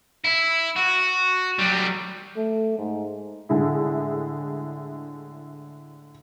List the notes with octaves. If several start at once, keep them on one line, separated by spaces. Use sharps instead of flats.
E4
F#4
F#3 G3
A3
G#2
A2 D3 G#3 E4